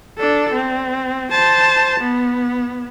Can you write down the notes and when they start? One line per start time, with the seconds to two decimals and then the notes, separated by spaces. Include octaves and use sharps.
0.18 D4 A4
0.53 C4
1.32 C5 A5
2.00 B3